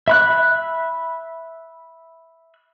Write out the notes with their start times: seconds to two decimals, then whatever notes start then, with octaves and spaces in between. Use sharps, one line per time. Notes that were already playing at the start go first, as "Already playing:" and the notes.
0.08 E5 B5 F#6